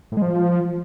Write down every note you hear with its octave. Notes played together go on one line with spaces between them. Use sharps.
A2
G#3
F3